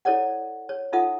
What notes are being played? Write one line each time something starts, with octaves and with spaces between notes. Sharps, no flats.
E4 A4 C#5 D5 F#5
C#5
D#4 F4 A4 E5 F#5 D#6